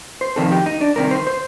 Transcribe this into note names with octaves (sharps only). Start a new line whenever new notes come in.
C5
F2 C3 D#3 A4
G4
D#4
D4
C2 C3 D#3 A#4
C5
C5